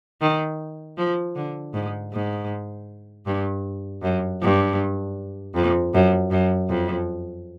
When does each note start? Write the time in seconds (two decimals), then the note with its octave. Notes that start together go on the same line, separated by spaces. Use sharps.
0.21 D#3
0.98 F3
1.36 D3
1.74 G#2
2.13 G#2
3.26 G2
4.03 F#2
4.42 G2
5.55 F2
5.94 F#2
6.31 F#2
6.69 F2